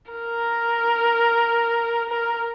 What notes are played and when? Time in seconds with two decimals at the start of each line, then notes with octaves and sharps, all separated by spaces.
0.12 A#4
2.09 A#4